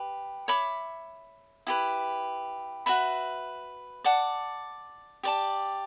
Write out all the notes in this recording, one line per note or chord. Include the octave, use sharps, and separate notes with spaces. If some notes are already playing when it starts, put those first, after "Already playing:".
Already playing: G4 B4
C#5 E5 B5 D6
E4 G4 B4
F#4 B4 E5 B5
D5 F#5 A5
G4 D5 A5